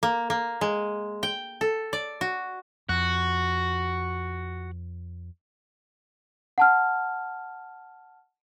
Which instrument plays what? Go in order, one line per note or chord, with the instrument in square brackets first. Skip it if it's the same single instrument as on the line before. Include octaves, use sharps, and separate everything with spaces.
[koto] A#3
A#3
G#3
G5
A4
D5
F#4
[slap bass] F2 [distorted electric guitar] F#4
[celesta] F#5 A5 F6